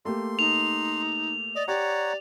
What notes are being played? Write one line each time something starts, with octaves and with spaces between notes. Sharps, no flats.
A3 A#3 G4 C6
D#4 F7
D5 D#5
G4 C#5 D5 F#5 A#5